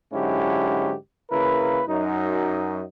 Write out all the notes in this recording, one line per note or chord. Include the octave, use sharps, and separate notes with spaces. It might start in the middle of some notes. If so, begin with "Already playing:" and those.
G#2 D3 F#3 C#4 E4 G4
C#3 A#3 E4 A#4 B4
F#2 D#4